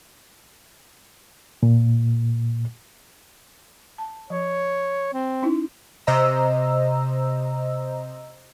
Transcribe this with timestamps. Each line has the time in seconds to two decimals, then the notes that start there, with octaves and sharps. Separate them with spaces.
1.63 A#2
3.98 A5
4.30 F3 C#5
5.13 C4
5.42 C#4 D#4 E4
6.07 C3 C5 D#5 A#5 E6